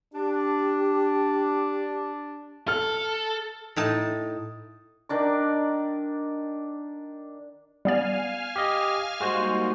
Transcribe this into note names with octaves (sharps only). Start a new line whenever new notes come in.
D4 G4
A4 F6
A2 D#4 A5
D#3 D4 D6
G3 B3 D5 F5 G#5 F6
G4 D#5
G3 G#3 A#3 D#4 F#4 C5